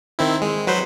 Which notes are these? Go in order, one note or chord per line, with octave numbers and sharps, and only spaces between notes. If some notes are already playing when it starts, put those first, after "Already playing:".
D#3 C4 E4
G#3
F#3 B4 C5